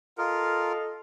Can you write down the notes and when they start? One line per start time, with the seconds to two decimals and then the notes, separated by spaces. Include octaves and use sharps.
0.18 F4 A4 A#4 D#5 F5